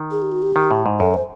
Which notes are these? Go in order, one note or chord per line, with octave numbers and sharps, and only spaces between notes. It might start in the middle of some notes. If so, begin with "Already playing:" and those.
Already playing: D#3
G#4
G4
F#4
G4
D#3
A2
G#2
F#2 A4
C5